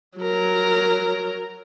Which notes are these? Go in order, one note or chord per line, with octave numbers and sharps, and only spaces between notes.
F#3 A#4